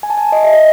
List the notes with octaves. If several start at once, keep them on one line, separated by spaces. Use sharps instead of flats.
G#5
A5
G#5
D#5
E5
D#5